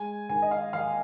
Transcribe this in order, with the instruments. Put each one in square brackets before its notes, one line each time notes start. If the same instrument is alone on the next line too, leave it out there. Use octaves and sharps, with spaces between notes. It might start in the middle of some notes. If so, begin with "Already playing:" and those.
Already playing: [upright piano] G#3 G#5
D#3 G#5
D#5
F5
D#2 F5